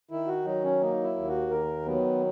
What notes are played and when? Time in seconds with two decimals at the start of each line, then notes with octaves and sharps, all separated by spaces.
0.11 D#3 E4
0.28 F#4
0.45 F#3 D#4
0.64 C#4
0.81 A#3 D#4
1.04 E4
1.16 D#2
1.28 F#4
1.50 D#3 A#4
1.86 F#3 B3